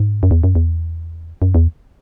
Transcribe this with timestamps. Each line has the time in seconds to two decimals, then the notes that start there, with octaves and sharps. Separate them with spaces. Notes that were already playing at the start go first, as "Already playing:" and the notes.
Already playing: G#2
0.23 F#2
0.31 E2
0.43 F#2
0.55 E2
1.42 F#2
1.54 E2